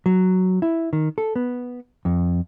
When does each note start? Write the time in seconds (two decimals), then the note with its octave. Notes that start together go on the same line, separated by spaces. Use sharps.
0.06 F#3
0.62 E4
0.93 D#3
1.18 A4
1.36 B3
2.05 F2